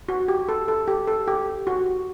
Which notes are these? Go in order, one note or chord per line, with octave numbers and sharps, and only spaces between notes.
F#4
G4
A4
A4
G4
A4
G4
F#4